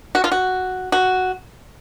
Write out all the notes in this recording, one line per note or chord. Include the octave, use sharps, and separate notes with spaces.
F#4
F4
F#4
F#4